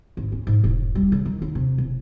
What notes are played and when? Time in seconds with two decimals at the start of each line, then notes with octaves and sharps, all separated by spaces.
0.17 G#1
0.32 C#4
0.47 G#2
0.64 E1
0.95 G3
1.12 C#3
1.25 D#3
1.42 D#2
1.55 C3
1.78 E1